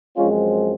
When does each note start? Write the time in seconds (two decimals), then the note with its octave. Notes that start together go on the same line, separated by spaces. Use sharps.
0.16 F#2 F3 G#3 C4 C#4 F4